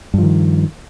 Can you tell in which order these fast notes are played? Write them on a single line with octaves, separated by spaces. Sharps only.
G2 F3 D#3